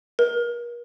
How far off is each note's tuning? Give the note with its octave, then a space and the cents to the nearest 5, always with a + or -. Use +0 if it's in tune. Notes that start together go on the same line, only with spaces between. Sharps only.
A#4 +40